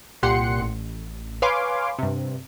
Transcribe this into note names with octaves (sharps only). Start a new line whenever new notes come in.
C2 A#2 G4 F#5 C6 C#7
A1
B4 C#5 F5 G#5 C6 D6
G2 C3